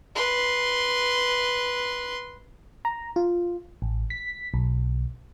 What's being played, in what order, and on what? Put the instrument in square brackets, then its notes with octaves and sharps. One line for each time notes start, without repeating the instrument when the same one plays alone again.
[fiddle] B4 C6
[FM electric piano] A#5
F4
A1
B6
B1